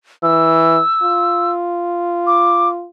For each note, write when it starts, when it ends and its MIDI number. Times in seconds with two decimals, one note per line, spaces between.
0.23 0.79 52
0.23 1.52 88
1.03 2.87 65
2.27 2.69 86